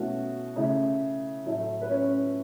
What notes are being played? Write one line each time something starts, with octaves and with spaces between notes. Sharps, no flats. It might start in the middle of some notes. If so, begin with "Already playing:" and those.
Already playing: B2 A3 C#4 E4 F#4
C#3 A3 E4
A2 F#3 A3 E4
B4
C#4 C#5